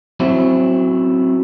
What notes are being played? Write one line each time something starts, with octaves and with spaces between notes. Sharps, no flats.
F#3 C4 C#4 E4